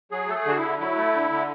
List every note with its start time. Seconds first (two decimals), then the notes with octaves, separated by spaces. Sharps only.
0.12 F#3 G#4
0.29 A3 A4
0.35 G#4
0.46 D3 F#4
0.57 E4
0.63 D3
0.80 F#3 E4
0.97 A3
1.14 D3
1.31 D3